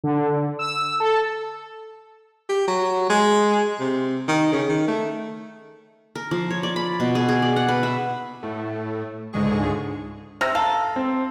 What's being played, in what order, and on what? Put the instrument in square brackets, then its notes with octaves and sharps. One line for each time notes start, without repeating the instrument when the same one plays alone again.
[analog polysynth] D3
E6
A4
[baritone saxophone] G4
F#3
G#3
C3
D#3
C#3
D#3
A3
[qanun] A#4
F3
C#5
D5
B5
B2
G#4
G#4
D5
F#5
B4
E5
[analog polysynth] A2 A3
C#2 G#2 D3 G#3 G#4 C#6
[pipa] C3 [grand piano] E6 F6 A#6
[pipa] A4 [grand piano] F5 A#5
[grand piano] C4